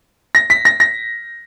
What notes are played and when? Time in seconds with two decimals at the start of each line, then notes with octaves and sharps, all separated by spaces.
0.35 A#6
0.50 B6
0.65 A#6
0.80 A#6